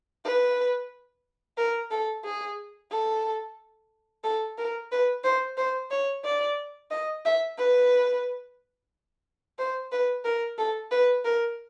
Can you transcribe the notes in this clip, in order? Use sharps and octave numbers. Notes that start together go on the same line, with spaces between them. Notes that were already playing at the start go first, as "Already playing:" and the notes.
B4
A#4
A4
G#4
A4
A4
A#4
B4
C5
C5
C#5
D5
D#5
E5
B4
C5
B4
A#4
A4
B4
A#4